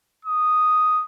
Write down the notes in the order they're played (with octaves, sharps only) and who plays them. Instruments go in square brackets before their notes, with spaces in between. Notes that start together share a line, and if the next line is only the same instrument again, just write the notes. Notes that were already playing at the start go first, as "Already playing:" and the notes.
[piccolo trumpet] D#6